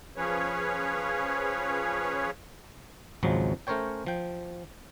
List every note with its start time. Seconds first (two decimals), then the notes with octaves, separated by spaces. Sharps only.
0.17 F3 C#4 G#4 B4 C#5
3.23 G#1 C#2 F3 F#3 G#3
3.67 A3 C#4 A#4 C5 C#5 G5
4.06 F3 G5